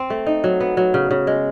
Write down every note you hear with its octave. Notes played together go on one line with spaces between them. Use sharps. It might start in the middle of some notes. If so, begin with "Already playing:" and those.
Already playing: C4
A3
D#4
F#3
B3
F#3
C#3
C#3
G#3